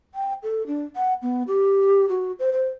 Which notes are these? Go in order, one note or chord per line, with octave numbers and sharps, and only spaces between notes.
G5
A4
D4
F#5
B3
G4
F#4
C5
C5